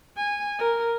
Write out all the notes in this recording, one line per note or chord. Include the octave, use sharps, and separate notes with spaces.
G#5
A#4